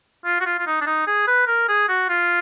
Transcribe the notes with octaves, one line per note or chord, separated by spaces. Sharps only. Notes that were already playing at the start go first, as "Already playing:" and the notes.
F4
F#4
F4
F4
D#4
D4
D#4
G#4
B4
A#4
G#4
F#4
F4